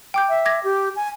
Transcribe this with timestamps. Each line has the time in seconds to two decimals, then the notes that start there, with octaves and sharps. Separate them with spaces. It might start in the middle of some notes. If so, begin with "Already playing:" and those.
0.14 G5 D6 G6
0.29 E5
0.45 D6 G#6 A#6
0.64 G4
0.96 G#5